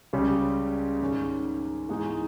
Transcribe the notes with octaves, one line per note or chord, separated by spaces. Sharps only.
C#2 C#3 G3 C#4
G#2 D#3 G#3 C#4
G#2 E3 G#3 D#4